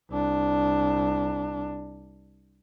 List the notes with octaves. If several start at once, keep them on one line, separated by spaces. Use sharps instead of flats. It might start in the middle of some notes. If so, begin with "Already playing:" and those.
C2 D4